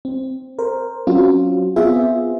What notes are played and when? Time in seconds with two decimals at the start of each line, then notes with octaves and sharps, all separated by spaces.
0.05 C4
0.59 A#4 C5
1.07 F#3 C4 C#4 F4 F#4
1.76 B3 C4 F4 G#4 E5